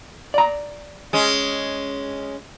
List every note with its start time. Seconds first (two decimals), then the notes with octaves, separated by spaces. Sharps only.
0.34 D5 A#5
1.13 G#3 C#4